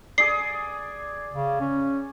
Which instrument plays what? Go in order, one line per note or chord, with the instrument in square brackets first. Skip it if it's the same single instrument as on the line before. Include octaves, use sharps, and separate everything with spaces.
[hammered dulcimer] G#4 D5 [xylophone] C7
[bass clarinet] C#3
C#4